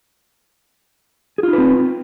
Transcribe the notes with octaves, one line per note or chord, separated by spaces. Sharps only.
C4 D#4 F4 G#4 B4